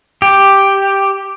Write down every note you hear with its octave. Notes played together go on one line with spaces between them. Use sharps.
G4